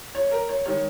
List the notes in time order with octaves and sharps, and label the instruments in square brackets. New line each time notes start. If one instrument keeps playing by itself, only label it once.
[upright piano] C#5
A#4
C#5
D#3 G#3 C#5